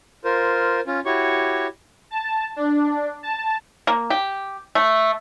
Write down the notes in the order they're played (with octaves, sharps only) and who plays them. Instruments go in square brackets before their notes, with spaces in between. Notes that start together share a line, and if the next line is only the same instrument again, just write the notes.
[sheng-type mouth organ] F4 A#4 C5
C#4 F4
E4 F#4 G4 C#5 C#6
[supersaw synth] A5
D4
A5
[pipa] A#3
G4
A3